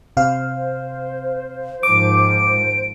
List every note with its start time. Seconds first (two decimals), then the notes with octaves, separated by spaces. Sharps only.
0.17 C3 C5 F5
1.83 G#2 D#3 F3 D6 D7